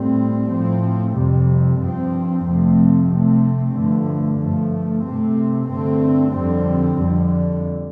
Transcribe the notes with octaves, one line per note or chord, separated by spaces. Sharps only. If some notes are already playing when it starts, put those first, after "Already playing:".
Already playing: A2 G3 C4
A2 F3 C4
F2 C3 G3
G2 F3 C4
F2 C3 F3 A3 C4
C3 A3 C4
G2 D3 F3 A3
G2 F3 A3
C3 A3 C4
G2 D3 A3 C4
F2 D3 G3 C4
F2 D3 G3